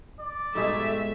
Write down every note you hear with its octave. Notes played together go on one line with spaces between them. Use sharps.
D5
G#2 B2 G3 A3 G#4 E5